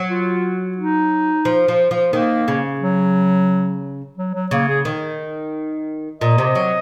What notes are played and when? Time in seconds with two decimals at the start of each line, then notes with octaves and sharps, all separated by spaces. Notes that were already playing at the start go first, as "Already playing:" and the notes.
Already playing: F#3
0.09 F4
0.78 D#4
1.45 F3
1.68 F3
1.91 F3
2.13 D#3 A#3
2.48 C#3
2.81 F#3
4.18 F#3
4.35 F#3
4.51 C#3 A#3
4.68 G#4
4.85 D#3
6.21 A#2 D#5
6.38 C3
6.55 F#3